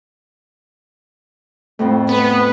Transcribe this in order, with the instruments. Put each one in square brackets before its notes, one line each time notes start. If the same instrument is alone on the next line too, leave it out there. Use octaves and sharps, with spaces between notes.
[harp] F2 A2 A3
[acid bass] B3 [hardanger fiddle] B4